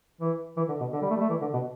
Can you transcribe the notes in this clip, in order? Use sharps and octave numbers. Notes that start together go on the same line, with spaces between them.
E3
E3
D3
B2
D3
G3
A3
G3
A3
E3
D3
B2